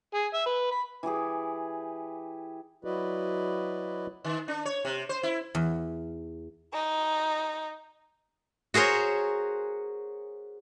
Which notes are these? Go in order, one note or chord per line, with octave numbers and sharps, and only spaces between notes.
G#4
E5
B4
B5
E3 E4 G4 G#4
F#3 E4 F#4 B4 D5 D#5
D#3
D4
C#5
C3
C5
E4
E2
D#4
F#4 G#4 A#4 C5 C#5